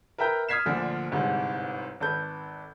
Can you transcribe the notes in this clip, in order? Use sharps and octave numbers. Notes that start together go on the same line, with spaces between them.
A#4 B4 E5 G5 A#5 G6
D#6 F6 G#6 B6 C7 E7
D2 A#2 D3 F3
G1 C2 G#2
G#1 A4 B4 G6